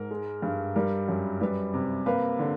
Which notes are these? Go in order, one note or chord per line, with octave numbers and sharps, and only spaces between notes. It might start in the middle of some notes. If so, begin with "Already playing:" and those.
Already playing: G#2 A#4
G#3
G2
G3 A#4
F#2
G3 B4
C3
A#3 B4
D3